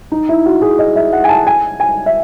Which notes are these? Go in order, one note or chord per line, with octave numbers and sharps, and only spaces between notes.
D#4
E4
F#4
G#4
D#5
E5
F#5
G#5
A5
G#5
G#5
E5